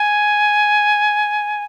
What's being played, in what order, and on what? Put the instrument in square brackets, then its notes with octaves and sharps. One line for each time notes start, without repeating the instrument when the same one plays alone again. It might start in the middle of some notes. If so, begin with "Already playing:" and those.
Already playing: [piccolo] G#5